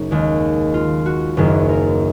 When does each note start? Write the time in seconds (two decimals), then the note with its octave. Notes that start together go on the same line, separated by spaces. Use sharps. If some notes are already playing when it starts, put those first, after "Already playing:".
Already playing: F#1 A#3 C#4 D#4
0.11 D#2 D#3 G#3
0.74 F4
1.06 F#4
1.37 F#1 F#2 D#3 A#3 G#4
1.69 A#4